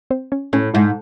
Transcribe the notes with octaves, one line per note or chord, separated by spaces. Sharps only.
C4 C5
C#4 C#5
A2 C#4 C#5
G#2 E4 E5